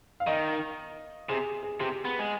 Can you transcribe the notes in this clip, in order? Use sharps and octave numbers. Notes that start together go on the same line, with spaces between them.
F5
D#3 D#5
C3 G#4
G#4
C3 G4
B3
G#3